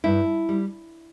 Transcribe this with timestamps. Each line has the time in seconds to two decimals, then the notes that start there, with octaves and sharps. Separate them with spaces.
0.04 G2 E4
0.49 G3